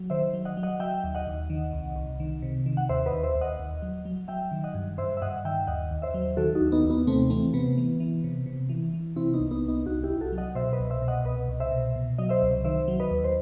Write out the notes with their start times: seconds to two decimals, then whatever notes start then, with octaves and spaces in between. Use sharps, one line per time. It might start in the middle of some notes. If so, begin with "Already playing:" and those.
Already playing: F#3
0.10 D#3 C5 E5
0.34 F#3
0.45 D#5 F#5
0.57 F#3
0.63 D#5 F#5
0.80 F#3 E5 G5
1.04 D#2
1.15 D#5 F#5
1.27 D#2
1.50 D#3
1.73 C2
1.96 C2
2.20 D#3
2.42 C3
2.66 D#3
2.77 F#5
2.89 D#2 C5 E5
3.06 B4 D#5
3.12 D#2
3.23 C5 E5
3.35 D#2
3.41 D#5 F#5
3.59 D#2
3.82 F#3
4.05 F#3
4.28 F#3 E5 G5
4.52 D#3
4.64 D#5 F#5
4.74 G2
4.98 G2 C5 E5
5.17 E5
5.22 G2 D#5 F#5
5.45 D#3 E5 G5
5.67 D#2 D#5 F#5
5.91 D#2
6.02 C5 E5
6.14 F#3
6.37 D#3 F#4 A4
6.55 D#4 F#4
6.61 D#2
6.72 B3 D#4
6.84 D#2
6.90 B3 D#4
7.07 C3 A3 C4
7.30 E3 A3 C4
7.54 C3 B3
7.78 E3
8.00 E3
8.24 C3
8.46 C3
8.69 E3
8.94 E3
9.16 C3 C4 E4
9.34 B3 D#4
9.40 C2
9.51 B3 D#4
9.63 C2
9.68 B3 D#4
9.86 C2 D#4 F#4
10.04 E4 G4
10.09 C2
10.21 F#4 A4
10.32 F#3
10.38 D#5 F#5
10.55 B2 C5 E5
10.73 B4 D#5
10.79 C2
10.90 C5 E5
11.02 B2
11.08 D#5 F#5
11.25 C2 B4 D#5
11.48 C2
11.60 C5 E5
11.71 B2
11.96 B2
12.18 F#3 D#5
12.29 C5 E5
12.42 C2
12.64 D#3 C5 E5
12.88 F#3
13.00 B4 D#5
13.11 D#2
13.24 C5